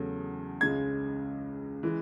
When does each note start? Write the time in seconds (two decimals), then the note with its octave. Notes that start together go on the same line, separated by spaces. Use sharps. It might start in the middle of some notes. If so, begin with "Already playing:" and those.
Already playing: E2 C#3 F#3 A3
0.61 C#2 C#3 G#3 G#6
1.83 E3 G#3